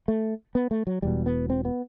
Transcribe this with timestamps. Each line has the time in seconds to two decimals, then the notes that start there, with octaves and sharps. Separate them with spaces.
0.08 A3
0.55 B3
0.71 A3
0.87 F#3
1.02 E1 E2 B2 G3
1.26 B3
1.50 C4
1.65 B3